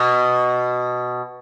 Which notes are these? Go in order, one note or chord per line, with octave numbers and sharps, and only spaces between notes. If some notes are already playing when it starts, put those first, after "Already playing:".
Already playing: B2